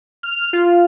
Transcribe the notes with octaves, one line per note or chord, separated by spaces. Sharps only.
F6
F4